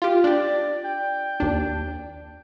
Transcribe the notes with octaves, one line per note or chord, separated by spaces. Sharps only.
F4 G4
D4 G4 D5
G5
D#2 D4